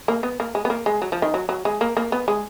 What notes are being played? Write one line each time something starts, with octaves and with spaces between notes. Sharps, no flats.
A#3
B3
A#3
G#3
B3
A#3
G#3
F#3
F3
D#3
F#3
F#3
G#3
A#3
A#3
B3
G#3